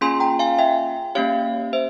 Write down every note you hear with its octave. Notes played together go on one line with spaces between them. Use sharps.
A#3 C#4 F4 G#4 G#5 C6
G5 A#5
F5 G#5
E5 G5
A#3 C#4 G4 C#5 F5
C5 E5